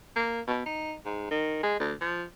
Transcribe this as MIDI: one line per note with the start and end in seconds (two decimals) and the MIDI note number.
0.16 0.41 58
0.47 0.62 47
0.66 0.94 63
1.06 1.30 44
1.31 1.62 51
1.63 1.79 56
1.80 1.94 38
2.01 2.24 53